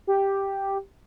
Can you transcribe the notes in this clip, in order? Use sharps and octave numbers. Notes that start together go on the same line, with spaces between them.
G4